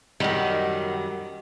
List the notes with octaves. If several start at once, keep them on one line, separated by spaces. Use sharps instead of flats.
F#2 D#3 F#3 G3